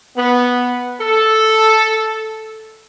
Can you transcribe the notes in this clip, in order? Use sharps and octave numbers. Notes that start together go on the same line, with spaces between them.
B3
A4